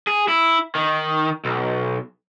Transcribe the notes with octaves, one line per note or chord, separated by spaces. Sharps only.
G#4
E4
D#3
B1